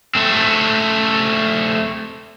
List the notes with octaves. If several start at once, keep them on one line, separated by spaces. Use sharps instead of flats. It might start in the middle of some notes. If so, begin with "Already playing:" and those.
A3 C4